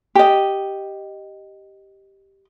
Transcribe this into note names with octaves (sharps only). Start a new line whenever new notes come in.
G4 D#5